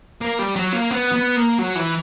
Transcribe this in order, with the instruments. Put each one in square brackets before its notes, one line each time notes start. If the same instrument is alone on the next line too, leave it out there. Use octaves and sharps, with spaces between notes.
[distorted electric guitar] A#3
G3
F#3
A#3
B3
B3
A#3
F#3
E3